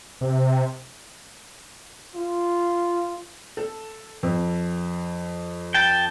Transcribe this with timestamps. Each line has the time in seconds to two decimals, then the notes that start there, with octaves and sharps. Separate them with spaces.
0.21 C3
2.15 F4
3.57 A4
4.23 F2
5.74 G5 A5